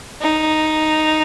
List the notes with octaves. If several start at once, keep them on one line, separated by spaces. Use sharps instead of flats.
D#4